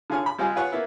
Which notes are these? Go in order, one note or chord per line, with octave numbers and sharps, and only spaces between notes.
D3 F4 G#4 C#5 F6
B5
G3 G#3 C4 F4 G4 G#4
F4 G#4 B4 C#5 F#5
A#3 B3 E4